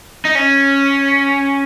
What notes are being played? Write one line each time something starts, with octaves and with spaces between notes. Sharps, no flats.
D#4
C#4